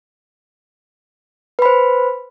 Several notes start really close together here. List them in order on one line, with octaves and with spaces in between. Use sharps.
B4 B5 C5